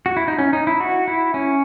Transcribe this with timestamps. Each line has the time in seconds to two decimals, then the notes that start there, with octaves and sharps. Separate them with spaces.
0.06 F#4
0.17 E4
0.28 D#4
0.39 C#4
0.53 D#4
0.67 E4
0.80 F#4
1.08 E4
1.34 C#4